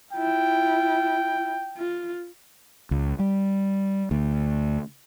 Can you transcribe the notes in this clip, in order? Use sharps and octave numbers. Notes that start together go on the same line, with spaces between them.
E4 F4 G5
F4
C#2
G3
D2